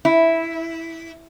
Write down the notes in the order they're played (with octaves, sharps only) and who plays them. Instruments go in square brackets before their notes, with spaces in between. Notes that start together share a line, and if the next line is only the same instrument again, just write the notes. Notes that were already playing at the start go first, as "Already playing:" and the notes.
[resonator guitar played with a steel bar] E4